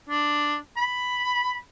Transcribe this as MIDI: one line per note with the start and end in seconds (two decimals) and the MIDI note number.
0.09 0.56 62
0.77 1.55 83